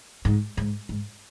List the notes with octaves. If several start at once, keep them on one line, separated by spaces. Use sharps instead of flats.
G#2
G#2
G#2